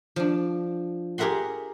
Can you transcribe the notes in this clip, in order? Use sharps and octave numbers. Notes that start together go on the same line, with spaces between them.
F3 D4
G4 G#4 A#4 E5 F#5 C6